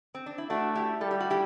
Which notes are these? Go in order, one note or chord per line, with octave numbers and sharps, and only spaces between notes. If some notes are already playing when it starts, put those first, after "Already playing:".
C4
D4
E4
A3 D4 F#4
E4 G4
G3 A4
G4
F#4
E4 G4